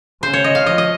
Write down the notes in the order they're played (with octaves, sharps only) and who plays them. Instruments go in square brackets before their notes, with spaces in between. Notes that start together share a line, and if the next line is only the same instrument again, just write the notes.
[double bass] C#3 [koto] C5
[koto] C#5
D#5
F5
[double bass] F3 [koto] D#5
[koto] D#5